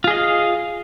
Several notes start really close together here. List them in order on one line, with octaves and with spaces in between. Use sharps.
F4 G#4 D#5 F5